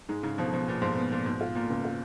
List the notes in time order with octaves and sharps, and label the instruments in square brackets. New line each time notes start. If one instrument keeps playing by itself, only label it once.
[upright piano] G#2 [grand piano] G#3
[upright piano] G#2 [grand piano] C#3
[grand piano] B2 [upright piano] F3
[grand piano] B2 [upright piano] F3
[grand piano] A#2 [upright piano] B3
[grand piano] G#2 [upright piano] F3
[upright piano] B3
[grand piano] A#2 [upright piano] F3
[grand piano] G#2 [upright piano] B2
[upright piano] F4
[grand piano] A#2 [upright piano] A#3
[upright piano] C#2
F4